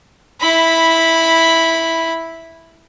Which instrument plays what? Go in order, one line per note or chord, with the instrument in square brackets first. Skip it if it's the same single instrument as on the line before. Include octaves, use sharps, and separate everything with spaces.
[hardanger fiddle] E4 B5